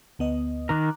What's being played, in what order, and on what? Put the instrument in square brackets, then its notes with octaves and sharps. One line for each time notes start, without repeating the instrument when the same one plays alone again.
[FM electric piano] D2 B3 D#5
[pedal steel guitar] D#3 A#4 [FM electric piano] A#5 D6 F#6